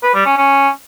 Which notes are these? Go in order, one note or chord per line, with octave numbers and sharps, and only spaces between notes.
B4
G3
C#4
C#4